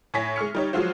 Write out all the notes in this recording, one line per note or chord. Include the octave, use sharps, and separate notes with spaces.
A2 C#5 G#5 A#6 B6
G#3 C#6 F6 C#7
G3 D#4 C#5
F3 F#3 G#3 F4 F#4 C5